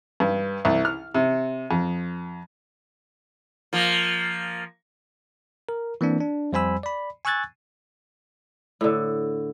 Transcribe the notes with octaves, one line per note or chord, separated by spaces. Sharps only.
G2
C2
F6
C3
F2
F3 A#3
A#4
E3 A#3 C4 D4
D4
F2 G3 C5 G#5 B5 E6
D5 B5
G#5 C#6 E6 F#6 G#6 A6
A2 D3